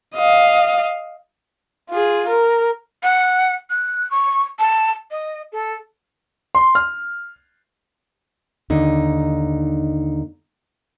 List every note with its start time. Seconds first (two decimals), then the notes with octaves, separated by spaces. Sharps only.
0.16 D#5 F5
1.90 F4 G#4
2.28 A#4
3.03 F#5
3.70 F#6
4.11 C#6
4.59 A5
5.11 D#5
5.52 A4
6.55 C6
6.75 F6
8.70 D#2 D3 D#4